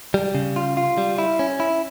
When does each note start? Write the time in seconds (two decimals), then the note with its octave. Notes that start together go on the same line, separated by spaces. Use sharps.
0.14 G3
0.35 C#3
0.56 F4
0.77 F4
0.98 G3
1.18 E4
1.39 C#4
1.60 E4